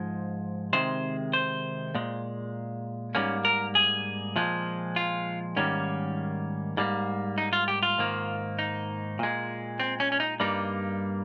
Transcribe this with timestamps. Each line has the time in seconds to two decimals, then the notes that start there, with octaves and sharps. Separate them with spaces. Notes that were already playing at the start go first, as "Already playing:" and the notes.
Already playing: G#2 F3 G#3
0.73 C3 D#3 G#3 C5
1.33 C5
1.95 A#2 G#3
3.15 G#2 G3 A#3 C#4
3.45 A#4
3.75 G#4
4.36 A#2 F3 G#3
4.96 F4
5.56 G#2 D#3 G3 A#3 C#4
6.77 G#2 G3 A#3
7.38 D#4
7.53 F4
7.68 G4
7.83 F4
7.98 G#2 D#3 A#3
8.59 D#4
9.19 A#2 G#3
9.80 C4
10.00 C#4
10.12 C#4
10.20 D#4
10.40 G2 G3 A#3 D#4